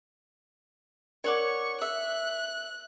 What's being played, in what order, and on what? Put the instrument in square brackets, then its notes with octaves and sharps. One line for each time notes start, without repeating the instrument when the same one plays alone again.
[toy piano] D4 A#4 D5 [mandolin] C#5 F#5 D6 [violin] C#6
[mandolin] E5 [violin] F#6